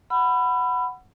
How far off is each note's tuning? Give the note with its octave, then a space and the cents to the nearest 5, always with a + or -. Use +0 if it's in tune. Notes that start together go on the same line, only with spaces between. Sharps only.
F#5 +0 B5 +10 E6 +45